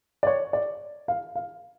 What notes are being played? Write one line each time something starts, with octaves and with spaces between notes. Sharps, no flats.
D5
C#5
D5
F5
F5